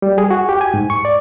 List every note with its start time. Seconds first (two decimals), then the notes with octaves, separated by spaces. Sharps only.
0.02 G3
0.18 G#4
0.31 F#4
0.49 G4
0.61 G#5
0.74 G#2
0.90 C#6
1.05 D5